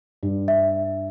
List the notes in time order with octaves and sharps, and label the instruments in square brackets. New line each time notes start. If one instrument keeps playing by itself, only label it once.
[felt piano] G2
[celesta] E5